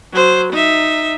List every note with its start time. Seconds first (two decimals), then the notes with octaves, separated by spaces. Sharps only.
0.13 F#3 C5
0.52 D#4 E5